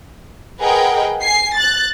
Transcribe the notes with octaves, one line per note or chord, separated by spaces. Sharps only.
G#4 A#4 B4 D#5 F#5 G5
G#5 C7
F#6 A6